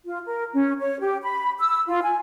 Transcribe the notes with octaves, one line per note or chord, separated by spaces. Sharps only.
F4
A#4
C#4
C#5
G4
B5
E6
F4
G#5